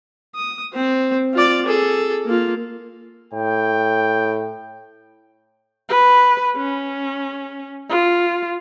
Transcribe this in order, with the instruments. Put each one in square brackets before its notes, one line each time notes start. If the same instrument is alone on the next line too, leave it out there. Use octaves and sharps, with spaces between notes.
[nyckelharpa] D#6
C4 C5
F4 D5
G#4 A4
A#3 F4
[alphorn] A2 [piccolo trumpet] G5
[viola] B4
C#4
F4